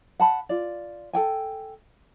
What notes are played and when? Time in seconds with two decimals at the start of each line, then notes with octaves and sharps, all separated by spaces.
0.20 F#5 A5 B5
0.49 F4 D5
1.13 A4 G5 G#5